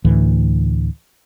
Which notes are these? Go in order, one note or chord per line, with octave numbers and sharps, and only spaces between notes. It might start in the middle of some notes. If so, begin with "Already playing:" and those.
D2 A2 E3